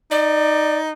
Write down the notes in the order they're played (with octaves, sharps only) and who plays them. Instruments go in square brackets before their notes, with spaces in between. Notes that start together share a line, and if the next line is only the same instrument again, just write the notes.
[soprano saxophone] D#4 [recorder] D5